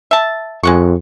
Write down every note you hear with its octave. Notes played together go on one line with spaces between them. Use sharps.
E5 A5
F2 G#3 F#5 C#6